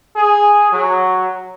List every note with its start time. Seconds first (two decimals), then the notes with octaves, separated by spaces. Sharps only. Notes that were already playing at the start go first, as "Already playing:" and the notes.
0.16 G#4
0.72 F#3